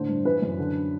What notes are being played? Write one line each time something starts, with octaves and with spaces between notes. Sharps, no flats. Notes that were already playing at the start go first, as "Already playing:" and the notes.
Already playing: A2 D3 C5
G2
E3 B4
F#2
D3